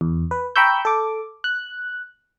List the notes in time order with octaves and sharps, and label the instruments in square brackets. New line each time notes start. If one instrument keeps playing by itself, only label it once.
[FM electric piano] E2
B4
G5 A#5 B5 C#6 E6 G6
A4 D6
F#6